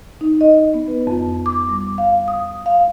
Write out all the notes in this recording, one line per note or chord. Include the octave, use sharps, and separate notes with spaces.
D#4
D#5
B3
B4
F2
D6
G3
F5
D#6
F5